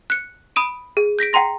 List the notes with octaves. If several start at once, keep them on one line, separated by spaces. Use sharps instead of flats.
F#6 C#7
B5 D#6 D7 D#7
G#4
G6 A#6 B6 D7
F#5 G5 A#5 C6 A#6